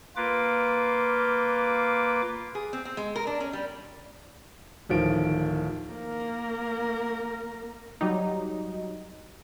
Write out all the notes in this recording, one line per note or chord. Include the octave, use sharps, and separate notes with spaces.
A#3 F4 B4 D6
G#4
C4
C4
G#3
A#4
D4
C#4
G3
D1 D#3 F3 D7
A#3 A#4
F#3 G3 D#4